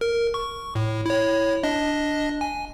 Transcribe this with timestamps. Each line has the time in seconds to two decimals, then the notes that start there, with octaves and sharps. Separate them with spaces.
0.01 A#4
0.34 C#6
0.75 A2
1.06 E4 C#5
1.63 D4 D#5
2.41 G#5